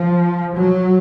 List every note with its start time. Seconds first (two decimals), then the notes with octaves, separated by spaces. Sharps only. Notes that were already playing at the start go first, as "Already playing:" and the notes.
Already playing: F3
0.55 F#3